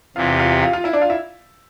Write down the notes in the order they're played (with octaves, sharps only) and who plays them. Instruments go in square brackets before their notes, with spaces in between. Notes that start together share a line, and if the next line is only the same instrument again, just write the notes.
[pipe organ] E2 C3 E3 [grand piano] F4 F5
[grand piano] G4 G5
F4 F5
G4 G5
F4 F5
F4 F5
E4 E5
D4 D5
F4 F5
E4 E5